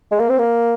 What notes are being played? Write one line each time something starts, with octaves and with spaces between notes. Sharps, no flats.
G#3
A#3
C4
A#3